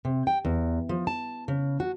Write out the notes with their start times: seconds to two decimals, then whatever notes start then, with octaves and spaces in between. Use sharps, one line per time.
0.05 C3
0.27 G5
0.45 E2
0.89 F3
1.07 A5
1.48 C#3
1.80 F#4